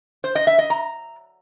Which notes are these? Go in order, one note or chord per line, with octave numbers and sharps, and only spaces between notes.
C5
D#5
E5
D#5
A#5